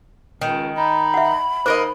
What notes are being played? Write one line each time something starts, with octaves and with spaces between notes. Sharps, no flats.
C#2 D#3
D#4 B5
E5 F#5
D#3 A#3 A#4 C5 D#5